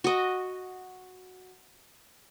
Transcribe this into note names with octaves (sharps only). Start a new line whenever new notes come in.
F#4 D#5